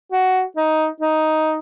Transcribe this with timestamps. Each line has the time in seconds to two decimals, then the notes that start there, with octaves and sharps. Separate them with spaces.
0.12 F#4
0.57 D#4
1.00 D#4